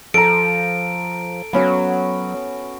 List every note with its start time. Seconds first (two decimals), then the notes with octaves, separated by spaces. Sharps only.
0.14 F3 A4 A#5 D7
1.53 F#3 B3 C#4 F#4